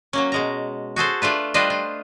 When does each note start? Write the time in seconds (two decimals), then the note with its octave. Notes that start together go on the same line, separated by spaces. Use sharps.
0.13 F#3 A#3 C#4
0.32 B2 G#3 A#5
0.96 F#4 G#4 A4 C5
1.22 A3 D4 F4 B4
1.54 G3 D4 F4 B4 C5 D#5
1.70 F4